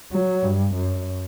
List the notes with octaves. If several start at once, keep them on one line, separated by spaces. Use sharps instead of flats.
F#3
G2
F#2